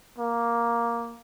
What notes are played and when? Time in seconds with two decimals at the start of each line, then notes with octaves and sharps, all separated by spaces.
0.18 A#3